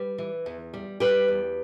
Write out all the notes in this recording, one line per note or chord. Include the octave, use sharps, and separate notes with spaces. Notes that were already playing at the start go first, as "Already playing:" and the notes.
Already playing: G3 B4
E3
E2
G3
G3 G4 B4
E2